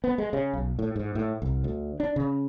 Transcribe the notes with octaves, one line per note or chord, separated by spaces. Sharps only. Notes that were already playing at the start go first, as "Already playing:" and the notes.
B3
G#3
C#3
B1
A2
G#2
A2
C2
D2
D4
C#3